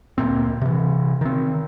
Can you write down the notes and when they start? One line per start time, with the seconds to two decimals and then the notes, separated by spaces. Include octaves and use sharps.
0.18 D1 G1 A#2 C4
0.61 C3 E3
1.21 D#3 C4